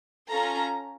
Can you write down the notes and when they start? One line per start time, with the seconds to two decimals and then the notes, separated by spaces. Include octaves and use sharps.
0.30 C#4 F4 A4 A#5